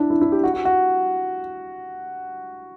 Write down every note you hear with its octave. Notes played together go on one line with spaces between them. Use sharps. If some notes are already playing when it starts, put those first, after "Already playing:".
Already playing: D4 E4
E4
E4
G4
F#4
F#4
F#4